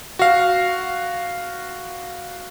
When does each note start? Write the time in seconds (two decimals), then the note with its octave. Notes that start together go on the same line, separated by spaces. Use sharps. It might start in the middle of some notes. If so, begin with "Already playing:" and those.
0.19 F#4 F5